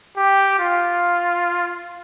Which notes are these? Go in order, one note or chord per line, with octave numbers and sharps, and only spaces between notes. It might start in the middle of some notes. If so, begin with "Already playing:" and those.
G4
F4